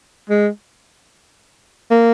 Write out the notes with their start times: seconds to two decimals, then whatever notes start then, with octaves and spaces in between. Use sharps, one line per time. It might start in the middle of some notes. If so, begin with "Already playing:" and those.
0.29 G#3
1.91 A#3